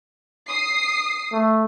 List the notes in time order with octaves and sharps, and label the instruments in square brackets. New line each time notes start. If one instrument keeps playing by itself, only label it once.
[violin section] D#6 C7
[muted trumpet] A3